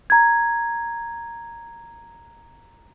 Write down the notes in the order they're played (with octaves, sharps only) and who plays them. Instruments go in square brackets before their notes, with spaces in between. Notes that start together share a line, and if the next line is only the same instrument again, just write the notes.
[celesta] A#5 G#6